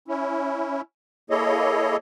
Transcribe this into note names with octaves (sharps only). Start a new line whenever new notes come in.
C#4 E4
A#3 E4 G#4 A4 C#5 D#5